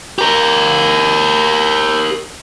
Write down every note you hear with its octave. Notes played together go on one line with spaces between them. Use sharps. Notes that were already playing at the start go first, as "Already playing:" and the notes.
G4 A#4